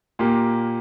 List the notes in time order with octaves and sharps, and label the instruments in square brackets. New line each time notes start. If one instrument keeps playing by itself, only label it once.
[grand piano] A#2 A#3 G4